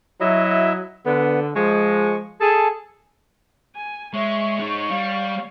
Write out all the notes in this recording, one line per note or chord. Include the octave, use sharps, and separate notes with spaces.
F#3 E4 D#5 E5
D3 B3
F3 G#3 C#6
G#4 A4 A5
G#5
G#3 C#5 E5 C#6
G#3 D#4
G3 F5